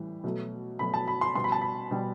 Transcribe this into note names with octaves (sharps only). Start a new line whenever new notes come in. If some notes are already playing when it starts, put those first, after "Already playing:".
Already playing: A2 E3 G3
B2 F#3 A3
B2 F#3 A3 B5
A5
B5
C6
B2 G3 C6
B5
A5
B5
B2 G3